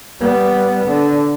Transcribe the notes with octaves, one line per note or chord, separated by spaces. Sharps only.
G3 B3
D3